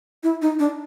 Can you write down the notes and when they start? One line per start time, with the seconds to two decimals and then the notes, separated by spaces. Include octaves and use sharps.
0.23 E4
0.42 D#4
0.59 D4